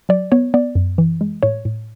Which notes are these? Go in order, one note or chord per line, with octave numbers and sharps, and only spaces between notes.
F#3 D5
B3 C#5
B3 D5
F#2
E3
G#3
A2 C#5
A2